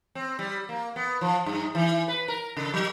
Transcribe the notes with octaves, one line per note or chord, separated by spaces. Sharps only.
C4
G3
A#3
B3
F3
G2
E3
B4
A#4
C#3
F#3